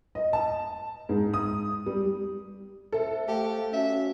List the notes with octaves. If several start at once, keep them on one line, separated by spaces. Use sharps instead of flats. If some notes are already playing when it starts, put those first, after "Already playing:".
D#5
A5
G#2
D#6
G3
A4 C5 E5
A3 G4 C5 F5 A5
C#4 F#4 E5